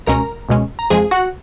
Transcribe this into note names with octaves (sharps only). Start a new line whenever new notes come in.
C#2 B2 G#3 C#4 A#4 A#5
C#2 B2 G#3 C#4
A#5
F2 F3 G#3 G#4 G#5
F#4 F#5